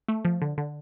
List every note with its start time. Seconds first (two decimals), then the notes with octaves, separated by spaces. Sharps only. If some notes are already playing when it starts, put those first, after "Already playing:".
0.09 A3
0.25 F3
0.42 D3
0.58 D3